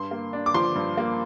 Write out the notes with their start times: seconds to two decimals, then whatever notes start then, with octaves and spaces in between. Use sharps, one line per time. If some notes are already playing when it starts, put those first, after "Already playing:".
Already playing: G2 C6
0.11 A#3
0.33 D4
0.46 D6
0.54 F3 C6
0.75 G2
0.97 A#3